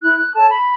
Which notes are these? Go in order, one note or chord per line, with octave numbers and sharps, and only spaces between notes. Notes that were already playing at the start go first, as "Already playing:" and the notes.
E4 F#6
F#6
A4 C#5 A5
B5